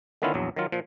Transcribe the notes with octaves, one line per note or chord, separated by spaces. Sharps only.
D3 D#3 B3 C#4 E4 F4
A#1 E2 F#3
D#3 F#3 F4
A#2 F3